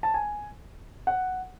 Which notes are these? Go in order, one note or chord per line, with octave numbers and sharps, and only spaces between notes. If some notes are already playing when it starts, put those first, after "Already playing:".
A5
G#5
F#5